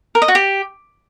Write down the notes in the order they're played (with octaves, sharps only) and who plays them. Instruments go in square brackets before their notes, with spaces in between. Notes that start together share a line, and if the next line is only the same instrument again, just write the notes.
[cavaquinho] A#4
D#5
F#4
G4